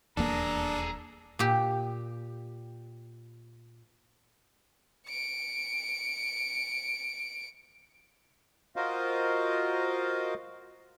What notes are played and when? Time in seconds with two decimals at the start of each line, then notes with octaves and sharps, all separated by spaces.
0.17 D#1 E2 A#3 D4 G#4 A4 A#5
1.39 A#2 G4
5.08 C#7 D7
8.76 F4 F#4 A#4 C5 D#5 F5